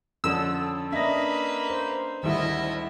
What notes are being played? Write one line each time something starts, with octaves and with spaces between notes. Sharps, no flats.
F2 D3 C#4 A4 E6
A#3 D4 B4 D#5 E5 A#6
C5
G#1 D2 A2 D#3 G3 E4 D#5 E5